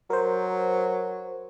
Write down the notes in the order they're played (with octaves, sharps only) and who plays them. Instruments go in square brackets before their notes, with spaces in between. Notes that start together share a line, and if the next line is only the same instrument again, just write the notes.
[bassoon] F#3 [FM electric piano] A#4 C5